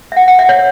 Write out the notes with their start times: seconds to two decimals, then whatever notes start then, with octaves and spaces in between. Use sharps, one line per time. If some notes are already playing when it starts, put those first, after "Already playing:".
0.12 E5
0.16 F#5
0.28 F#5
0.39 E5
0.49 C#5